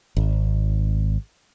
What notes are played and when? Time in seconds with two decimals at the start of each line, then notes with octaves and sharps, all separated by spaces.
0.17 G#1